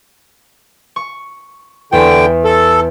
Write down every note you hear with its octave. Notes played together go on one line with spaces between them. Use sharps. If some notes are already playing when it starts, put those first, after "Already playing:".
C#6
E2 D3 G5
A4